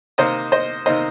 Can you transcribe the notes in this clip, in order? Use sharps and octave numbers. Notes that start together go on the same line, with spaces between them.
C3 D#3 A#3 D#4 C5 D#5
C5 D#5
C3 D#3 A#3 D#4 C5 D#5